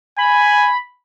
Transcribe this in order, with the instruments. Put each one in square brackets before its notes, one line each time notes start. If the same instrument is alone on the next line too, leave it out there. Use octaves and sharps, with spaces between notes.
[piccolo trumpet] G#5 [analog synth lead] B5